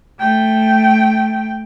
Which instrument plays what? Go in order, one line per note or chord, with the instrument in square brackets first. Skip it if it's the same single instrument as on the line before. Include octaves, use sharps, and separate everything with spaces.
[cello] A3 G5